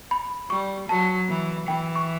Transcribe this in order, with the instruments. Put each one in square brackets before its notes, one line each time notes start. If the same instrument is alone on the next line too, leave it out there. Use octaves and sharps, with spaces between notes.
[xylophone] B5
[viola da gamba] G3 [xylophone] C#6
[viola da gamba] F#3 [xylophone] A5
[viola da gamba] E3
[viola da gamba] E3 [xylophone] G5
[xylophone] C#6